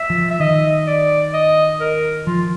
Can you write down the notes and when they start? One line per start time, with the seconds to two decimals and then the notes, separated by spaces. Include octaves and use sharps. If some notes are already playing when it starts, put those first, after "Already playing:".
Already playing: E5
0.10 F3
0.31 E5
0.40 D#3 D#5
0.87 D5
1.33 D#5
1.80 A#4
2.26 F3 F4